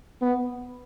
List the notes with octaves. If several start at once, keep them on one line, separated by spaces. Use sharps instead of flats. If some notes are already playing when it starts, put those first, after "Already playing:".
B3